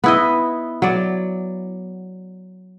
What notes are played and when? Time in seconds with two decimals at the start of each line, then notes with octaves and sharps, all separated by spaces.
0.04 B3 E4 D#5
0.82 F#3 D5